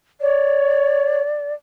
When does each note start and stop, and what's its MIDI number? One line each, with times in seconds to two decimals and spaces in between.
0.21 1.21 73
0.21 1.53 74